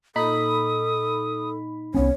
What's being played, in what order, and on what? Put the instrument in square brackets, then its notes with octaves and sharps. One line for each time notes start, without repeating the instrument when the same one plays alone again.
[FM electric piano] A#2 D#4 B5 [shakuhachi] A4 [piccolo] D#6
[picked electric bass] C2 B3 C#4 [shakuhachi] C#5